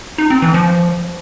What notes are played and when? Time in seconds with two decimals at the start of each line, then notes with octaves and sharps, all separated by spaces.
0.18 D#4
0.30 C4
0.42 E3
0.54 F3